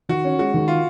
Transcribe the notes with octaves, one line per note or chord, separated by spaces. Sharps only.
D#3 F#4
C#4
G#3 F#4
D#3
F4